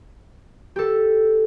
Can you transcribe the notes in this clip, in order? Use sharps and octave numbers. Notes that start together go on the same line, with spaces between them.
G4 A4